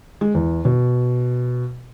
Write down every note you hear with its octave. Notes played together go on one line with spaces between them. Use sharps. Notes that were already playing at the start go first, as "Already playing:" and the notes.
G#3
E2
B2